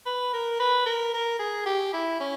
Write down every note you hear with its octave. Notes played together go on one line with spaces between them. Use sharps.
B4
A#4
B4
A#4
A#4
G#4
G4
E4
C#4